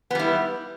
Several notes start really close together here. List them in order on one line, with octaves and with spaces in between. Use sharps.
B3 G3 E4